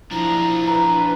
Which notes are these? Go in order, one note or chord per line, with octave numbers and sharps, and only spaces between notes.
F3 D4 E4 A#5
B4 A#5